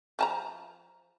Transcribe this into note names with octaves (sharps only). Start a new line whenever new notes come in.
F3 A5 A#5